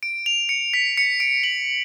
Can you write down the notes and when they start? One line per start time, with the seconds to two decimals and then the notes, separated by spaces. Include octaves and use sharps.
0.03 D7
0.26 F7
0.49 C#7
0.74 B6
0.97 C#7
1.20 D7
1.44 F#7